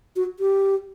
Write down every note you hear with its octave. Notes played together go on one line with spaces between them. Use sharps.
F#4
G4